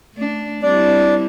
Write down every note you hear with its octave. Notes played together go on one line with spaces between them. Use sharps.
A3 D4
G3 C4 D4 E4 D5